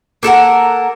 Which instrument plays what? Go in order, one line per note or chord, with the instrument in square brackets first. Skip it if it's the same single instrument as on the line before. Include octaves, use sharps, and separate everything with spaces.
[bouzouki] A#3 A4 A#4 F#5